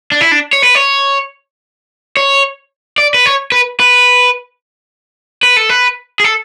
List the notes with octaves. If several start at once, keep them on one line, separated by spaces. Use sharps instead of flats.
D4
E4
D4
C#5
B4
C#5
C#5
D5
B4
C#5
B4
B4
B4
A4
B4
G#4
A4